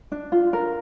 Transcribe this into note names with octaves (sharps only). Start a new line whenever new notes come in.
D4
F4
A#4